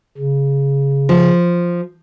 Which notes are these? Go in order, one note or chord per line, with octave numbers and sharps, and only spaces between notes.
C#3
F3